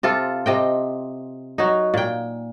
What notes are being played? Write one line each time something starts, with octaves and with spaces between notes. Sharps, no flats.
C3 F4 A4
C3 D#5 G5
F#3 D#4
A#2 G5